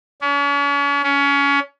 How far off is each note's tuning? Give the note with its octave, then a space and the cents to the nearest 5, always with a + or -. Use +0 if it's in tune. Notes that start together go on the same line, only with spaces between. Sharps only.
C#4 +40
C#4 +25